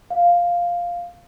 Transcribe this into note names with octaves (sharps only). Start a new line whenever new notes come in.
F5